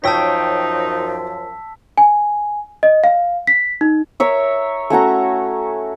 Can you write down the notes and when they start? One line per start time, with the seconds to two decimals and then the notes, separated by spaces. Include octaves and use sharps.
0.04 F#2 F3 D#4 C#5 G5 A5 E6 B6
1.98 G#5
2.83 D#5
3.04 F5
3.47 B6
3.81 D#4
4.20 A#4 C#5 E5
4.90 A3 C#4 F#4 A#5